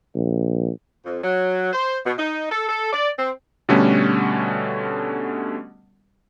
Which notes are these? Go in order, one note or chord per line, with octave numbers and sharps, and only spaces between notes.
A#1
F2
F#3
C5
B2
D#4
A4
A4
D5
C4
B2 D3 G3 A3 C#4 F#4